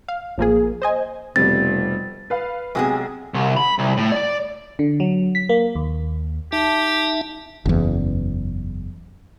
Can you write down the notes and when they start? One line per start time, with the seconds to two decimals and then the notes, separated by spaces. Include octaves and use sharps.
0.08 F5
0.38 A1 F3 A#3 G#4
0.82 C5 D#5 G#5
1.36 F1 B2 G3 C4 A6
2.30 B4 F5
2.75 B1 C3 G#3 F#4 G#4
3.34 C2
3.57 B5
3.79 C2
3.97 A2
4.12 D5
4.79 D3
5.00 F#3
5.35 B6
5.49 A#3
5.75 D#2
6.52 D#4 G4 E5 A5
7.66 F#1 E2